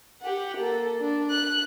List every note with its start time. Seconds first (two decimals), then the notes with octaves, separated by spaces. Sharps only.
0.21 G4 F#5
0.58 A#3 A4
1.01 D4
1.31 F#6